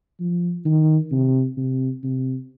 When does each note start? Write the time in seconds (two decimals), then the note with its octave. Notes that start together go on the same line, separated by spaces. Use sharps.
0.20 F3
0.65 D#3
1.12 C3
1.57 C3
2.03 C3